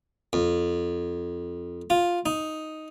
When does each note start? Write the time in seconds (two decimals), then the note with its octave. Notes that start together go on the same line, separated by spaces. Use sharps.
0.33 F2
1.90 F4
2.26 D#4